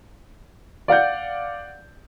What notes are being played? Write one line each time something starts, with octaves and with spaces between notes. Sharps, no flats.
D5 F5 F#5 G6